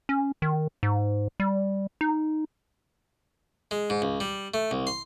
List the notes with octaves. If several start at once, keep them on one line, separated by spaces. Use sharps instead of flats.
C#4
D#3
G#2
G3
D#4
G#3
G#2
C#2
G3
A3
C2
C6